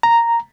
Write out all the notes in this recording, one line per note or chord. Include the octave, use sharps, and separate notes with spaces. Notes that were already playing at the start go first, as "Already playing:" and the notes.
A#5